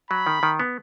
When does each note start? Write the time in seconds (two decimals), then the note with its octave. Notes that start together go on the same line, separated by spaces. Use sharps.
0.10 F#3 B5
0.27 D#3
0.43 D#3
0.60 B3